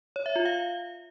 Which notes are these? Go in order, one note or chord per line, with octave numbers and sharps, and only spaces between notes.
C#5
E5
F4
F5